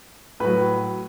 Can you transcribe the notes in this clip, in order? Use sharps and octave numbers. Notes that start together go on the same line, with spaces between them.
A2 F#3 B4